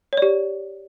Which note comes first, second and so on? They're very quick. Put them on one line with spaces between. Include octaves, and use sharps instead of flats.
C#5 D5 G4